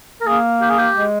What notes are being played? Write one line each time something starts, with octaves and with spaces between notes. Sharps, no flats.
A#4
A#3 G#4
G4
G#4
G4
G#3